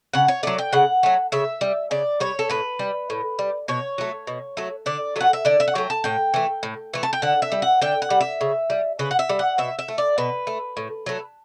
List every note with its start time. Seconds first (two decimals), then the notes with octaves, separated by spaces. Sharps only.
0.14 C#3 F#5
0.28 C#5
0.43 F#3 A3 D5
0.58 G5
0.73 C#3 F#5
1.03 F#3 A3
1.32 C#3 E5
1.61 G3
1.91 C#3 D5
2.20 G3 C#5
2.39 A4
2.50 A2 B4
2.79 G3
3.10 A2
3.39 G3
3.68 B2 C#5
3.98 F#3 A3
4.27 B2
4.57 F#3 A3
4.86 D3 D5
5.16 F#3 A3 F#5
5.33 E5
5.45 D3 D5
5.60 E5
5.68 F#5
5.75 F#3 A3 G5
5.90 A5
6.04 A2 G5
6.34 E3 A3
6.63 A2
6.94 E3 A3
7.03 A5
7.13 G5
7.22 D3 F#5
7.42 E5
7.52 G3
7.62 F#5
7.82 D3 G5
8.02 F#5
8.10 G3
8.21 E5
8.41 C#3
8.70 G3
8.99 C#3 B4
9.11 F#5
9.19 E5
9.29 G3
9.39 F#5
9.58 B2 E5
9.79 E5
9.88 A3
9.98 D5
10.18 B2 B4
10.47 A3
10.77 A2
11.06 F#3 A3